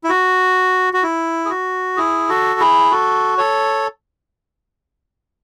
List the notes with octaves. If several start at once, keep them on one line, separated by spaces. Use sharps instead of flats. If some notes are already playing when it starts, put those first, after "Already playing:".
E4
F#4
F#4
E4
G#4
F#4
E4 G#4
F#4 A4
E4 G#4
F#4 A4
A4 C#5